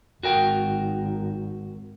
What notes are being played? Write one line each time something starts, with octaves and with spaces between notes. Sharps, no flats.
G#1 F#4 A#4 G5